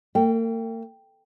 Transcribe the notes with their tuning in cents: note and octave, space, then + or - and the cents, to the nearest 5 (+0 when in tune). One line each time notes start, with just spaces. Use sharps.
A#3 -45 G5 +0